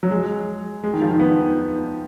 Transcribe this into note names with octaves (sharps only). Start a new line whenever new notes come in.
F#3
G#3
G#3
D#3
F3
D#3
B3